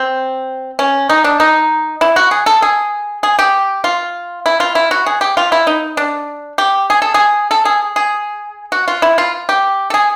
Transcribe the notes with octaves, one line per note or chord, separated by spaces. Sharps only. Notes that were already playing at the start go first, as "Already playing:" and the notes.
Already playing: C4
C#4
D#4
D4
D#4
E4
F#4
G#4
A4
G#4
G#4
G4
F4
E4
F4
E4
F#4
G#4
G4
F4
E4
D#4
D4
G4
G#4
A4
G#4
A4
G#4
G#4
F#4
F4
E4
F4
G4
A4
G#4